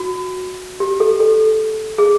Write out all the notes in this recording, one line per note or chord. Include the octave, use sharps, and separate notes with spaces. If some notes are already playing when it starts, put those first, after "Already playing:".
Already playing: F#4
G4
A4
A4
G#4